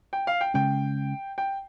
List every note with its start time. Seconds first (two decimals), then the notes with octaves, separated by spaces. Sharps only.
0.13 G5
0.27 F5
0.41 G5
0.54 C#3 G#3 C#4 G5
1.38 G5